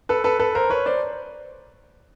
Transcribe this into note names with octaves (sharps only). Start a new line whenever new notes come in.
A4 B4
A4 B4
A4 B4
A#4 C5
B4 C#5
C5 D5